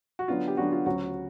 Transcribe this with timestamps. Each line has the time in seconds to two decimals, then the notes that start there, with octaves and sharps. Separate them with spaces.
0.19 F#4
0.28 D3 F#3 B3 D4 F4
0.48 G4
0.57 D3 F#3 B3 D4 F#4
0.72 F4
0.86 D2 C#3 F#3 F#4